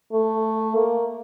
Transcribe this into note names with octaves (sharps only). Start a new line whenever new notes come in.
A3
A#3